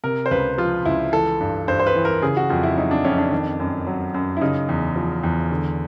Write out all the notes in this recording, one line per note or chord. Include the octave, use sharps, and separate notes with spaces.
C3 A#4
C5
C#2 B4
F3 F4
C#2 E4
E3 A4
G2
G2 C5
C5
B4
E3
A#4
C#3 G#4
F#4
F2 F4
E4
F#3 D#4
D4
F2 C#4
D4
D#3
F#2
F#3
F#2
E4
C#3 D#4
E2
F3
E2
D3